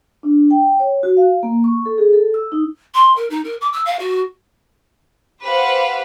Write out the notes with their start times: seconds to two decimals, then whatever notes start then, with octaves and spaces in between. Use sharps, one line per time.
0.23 D4
0.51 G5
0.80 C#5
1.03 F#4
1.17 F5
1.43 A#3
1.64 C#6
1.86 A4
1.98 G#4
2.13 A4
2.34 E6
2.52 D#4
2.94 C6
3.16 A#4
3.30 D#4
3.44 A#4
3.61 D6
3.73 E6
3.85 F5
3.99 F#4
5.42 G4 B4 C5 F5 F#5